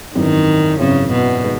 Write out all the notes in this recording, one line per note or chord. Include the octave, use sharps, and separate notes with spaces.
G#1 F#2 D#3 E3
G#1 F#2 C#3 E3
B2
D#3 G#3 B3